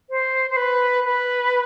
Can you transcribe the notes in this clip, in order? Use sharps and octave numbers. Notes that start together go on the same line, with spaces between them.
C5
C5
B4
B4